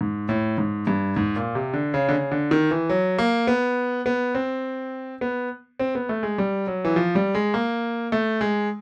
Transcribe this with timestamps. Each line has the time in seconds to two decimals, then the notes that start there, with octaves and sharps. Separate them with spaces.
0.01 G#2
0.29 A2
0.58 G#2
0.87 G2
1.16 G#2
1.36 A#2
1.55 C3
1.74 D3
1.94 C#3
2.09 D3
2.13 C#3
2.32 D3
2.51 D#3
2.71 E3
2.89 F#3
3.18 A#3
3.47 B3
4.06 B3
4.35 C4
5.21 B3
5.79 C4
5.95 B3
6.09 A3
6.23 G#3
6.38 G3
6.67 F#3
6.85 E3
6.96 F3
7.15 G3
7.35 G#3
7.54 A#3
8.12 A3
8.41 G#3